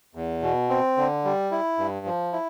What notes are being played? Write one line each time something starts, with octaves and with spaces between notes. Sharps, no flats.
E2
B2
C4
D3
G3
E4
G2
F3
E4